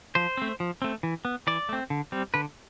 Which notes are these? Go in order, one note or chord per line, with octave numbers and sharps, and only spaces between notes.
F3 C5
A3 C4
F3
A3 C4
E3
B3
E3 D5
A3 C4
D3
G3 C4
D3 B4